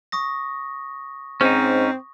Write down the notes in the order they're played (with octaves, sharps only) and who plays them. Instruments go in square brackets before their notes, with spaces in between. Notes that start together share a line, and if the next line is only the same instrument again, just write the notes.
[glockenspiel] C#6 D#6 A#6
[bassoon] G#2 [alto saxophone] C4 [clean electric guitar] C#4 D#4